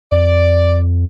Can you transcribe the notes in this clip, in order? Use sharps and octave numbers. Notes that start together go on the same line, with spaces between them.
F2 D5